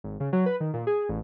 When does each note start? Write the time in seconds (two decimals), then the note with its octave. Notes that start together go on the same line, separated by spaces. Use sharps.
0.04 G#1
0.20 C#3
0.33 F#3
0.46 B4
0.60 D#3
0.74 A#2
0.87 G#4
1.09 A1